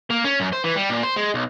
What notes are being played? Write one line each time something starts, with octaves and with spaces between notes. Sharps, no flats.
A#3
C#4
F#2
C5
E3
G3
A#2
C5
G#3
B1